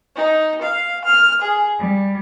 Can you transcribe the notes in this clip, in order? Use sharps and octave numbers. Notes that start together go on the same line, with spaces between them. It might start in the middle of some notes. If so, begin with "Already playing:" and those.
D#4
F5
F6
G#4
G3